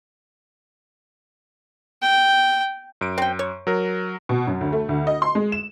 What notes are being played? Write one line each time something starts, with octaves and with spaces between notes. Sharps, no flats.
G5
F#2 D7
C4 G5
C#5
F#3 A#4
B2
F#2
D2
A3
D2
D#5
C6
G#3
E7